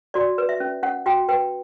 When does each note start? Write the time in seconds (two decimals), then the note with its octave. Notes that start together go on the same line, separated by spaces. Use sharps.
0.14 F#4 D5
0.38 B4
0.49 E5
0.60 C#4
0.83 C#4 F#5
1.06 F#4 G5
1.28 B4 G5